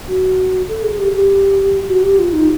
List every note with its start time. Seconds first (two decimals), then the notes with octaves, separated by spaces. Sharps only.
0.08 F#4
0.68 A4
0.83 G#4
0.99 G4
1.13 G4
1.88 F#4
2.03 G4
2.19 F4
2.33 D#4